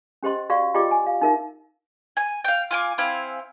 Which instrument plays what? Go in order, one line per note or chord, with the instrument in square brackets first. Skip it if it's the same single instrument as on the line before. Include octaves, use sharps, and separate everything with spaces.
[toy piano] C#4 G4 C5 D#5 C6
F#4 D5 F5 C#6
F4 G4 D5 D#5 G5 D6
G#5
F5
D#4 A#4 E5
[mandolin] G#5
F5 G5
F4 G#5 D6
C4 E4 F5 G#5